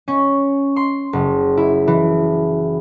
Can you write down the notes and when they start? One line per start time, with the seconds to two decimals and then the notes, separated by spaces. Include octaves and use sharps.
0.08 C#4
0.76 C6
1.13 F#1
1.57 E4
1.88 E3